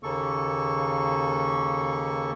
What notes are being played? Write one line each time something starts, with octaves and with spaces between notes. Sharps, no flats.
D#2 C#3 A#3 A4 C#6